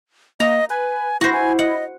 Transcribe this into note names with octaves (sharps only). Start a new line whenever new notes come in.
A#3 D#5 A#5
B4 G#5
E4 F#4 C5 A#6
G#5
D#5 F#5